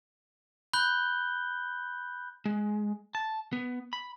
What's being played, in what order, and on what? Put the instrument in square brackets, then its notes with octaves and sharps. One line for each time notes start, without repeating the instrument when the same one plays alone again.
[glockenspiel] B5 F#6 G6 G7
[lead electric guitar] G#3
A5
B3
B5